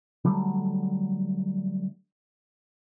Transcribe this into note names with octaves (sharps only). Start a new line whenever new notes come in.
D3 F#3 G3 A3